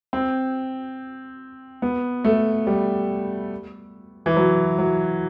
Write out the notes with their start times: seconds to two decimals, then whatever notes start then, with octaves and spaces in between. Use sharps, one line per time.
0.13 C4
1.82 B3
2.24 A3
2.67 G3
4.26 E3
4.37 F#3
4.79 F#3